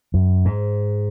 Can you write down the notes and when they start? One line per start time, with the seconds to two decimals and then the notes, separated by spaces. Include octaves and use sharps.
0.14 F#2
0.45 G#2